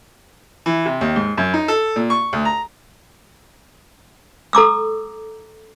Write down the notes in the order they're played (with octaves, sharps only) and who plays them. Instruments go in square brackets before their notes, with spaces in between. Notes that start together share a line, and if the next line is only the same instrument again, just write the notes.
[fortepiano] E3
C3
D#2
G#2
F#2
D#4
A4
A#2
C#6
D2
A#5
[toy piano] A4 A#5 D6 E6